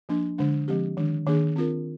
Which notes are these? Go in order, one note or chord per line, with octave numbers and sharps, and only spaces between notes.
F3 A#3 D4
D3 G#3 D4
F3 G#3 C4 G4
D#3 G#3 D4
D#3 A#3 D4 G#4
C4 F4 A#4